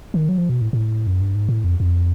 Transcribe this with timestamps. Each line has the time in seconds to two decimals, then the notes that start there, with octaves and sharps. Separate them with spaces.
0.14 D#3
0.29 F#3
0.38 F3
0.49 B2
0.61 A2
0.73 A2
1.07 F#2
1.21 G2
1.35 G#2
1.49 A2
1.64 F2
1.80 F2